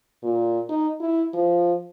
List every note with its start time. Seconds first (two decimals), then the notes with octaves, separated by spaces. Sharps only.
0.23 A#2
0.69 D#4
1.00 E4
1.34 F3